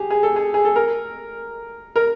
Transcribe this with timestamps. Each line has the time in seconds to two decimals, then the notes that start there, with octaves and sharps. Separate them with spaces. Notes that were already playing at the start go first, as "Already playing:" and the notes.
Already playing: G4 G#4
0.10 G#4
0.23 A4
0.36 G#4
0.54 G#4
0.65 A4
0.76 A#4
1.96 A#4